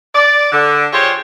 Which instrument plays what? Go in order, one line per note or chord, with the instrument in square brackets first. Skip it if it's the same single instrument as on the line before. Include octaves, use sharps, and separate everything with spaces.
[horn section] D5
D3
F4 G4 G#4 C5 C#5